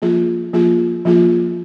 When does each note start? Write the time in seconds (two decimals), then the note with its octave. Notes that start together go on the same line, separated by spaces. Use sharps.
0.02 F3 A#3 F4 G#4
0.53 F3 A#3 F4 G#4
1.05 F3 A#3 F4 G#4